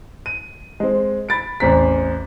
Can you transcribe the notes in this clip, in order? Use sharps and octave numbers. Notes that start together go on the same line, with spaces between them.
D#7
G#3 C4
B5 A6 D7
A1 E2 C4 A#5 B6